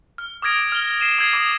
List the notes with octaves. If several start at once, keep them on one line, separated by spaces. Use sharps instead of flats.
F6
D6 D#6 F6 G#6 A#6 D7
F6 G7
C7 D#7 E7
D#6 E6 G#6 C7
D6 D#6 D#7